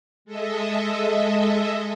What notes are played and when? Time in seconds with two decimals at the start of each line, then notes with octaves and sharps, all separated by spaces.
0.25 G#3 A4 D#5 E5